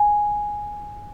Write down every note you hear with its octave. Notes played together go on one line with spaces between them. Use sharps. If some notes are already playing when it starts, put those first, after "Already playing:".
Already playing: G#5